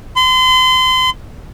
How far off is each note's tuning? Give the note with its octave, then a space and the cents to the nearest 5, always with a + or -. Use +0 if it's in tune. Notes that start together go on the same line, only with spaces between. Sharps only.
C6 -35